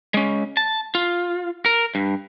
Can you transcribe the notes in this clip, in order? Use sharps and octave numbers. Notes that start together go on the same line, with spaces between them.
G#3 C#4
A5
F4
A#4
G2